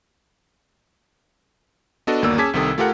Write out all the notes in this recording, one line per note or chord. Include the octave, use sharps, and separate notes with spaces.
B3 D4 F#4 A4 D5 D#5
G1 D#2 A#3 F#4 D5 E6
C#4 G#4 A5 D6 G#6 B6
C2 C3 D#3 G4 A4 D#6
A3 F4 G4 A4 A#4 F#5